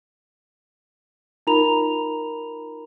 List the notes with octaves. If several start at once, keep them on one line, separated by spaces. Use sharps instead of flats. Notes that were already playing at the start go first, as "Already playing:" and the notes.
D#4 F4 A#4 A#5 B5 F7